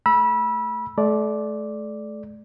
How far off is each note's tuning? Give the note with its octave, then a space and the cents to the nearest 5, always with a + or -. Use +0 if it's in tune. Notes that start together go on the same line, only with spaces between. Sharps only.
A3 +0 B5 -30 E6 +0
A3 -35 D5 +0